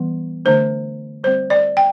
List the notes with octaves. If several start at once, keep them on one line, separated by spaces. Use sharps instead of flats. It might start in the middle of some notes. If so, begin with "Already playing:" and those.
Already playing: E3 G3 B3
D3 A3 D4 C5
G3 C4 C5
D5
G5